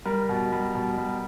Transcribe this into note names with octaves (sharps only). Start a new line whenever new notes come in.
G3 A#4
B2
G3
B2
G3